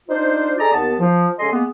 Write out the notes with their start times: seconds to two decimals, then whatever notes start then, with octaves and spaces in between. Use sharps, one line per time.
0.08 D4 D#4 F4 C5
0.57 G#4 A4 D5 D#5 A#5
0.72 D#2 B3 A5
1.00 F3
1.38 C#3 G#3 A4 D#5 G#5 C6
1.50 G#3 A#3 B3